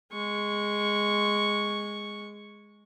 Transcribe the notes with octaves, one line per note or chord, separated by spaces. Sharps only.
G#3 C#6